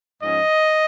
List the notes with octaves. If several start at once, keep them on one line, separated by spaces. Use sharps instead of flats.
G#2 F3 C#4 D#5